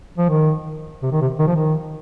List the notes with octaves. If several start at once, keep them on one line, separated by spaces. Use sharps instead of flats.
F3
D#3
C3
D#3
C3
D#3
F3
D#3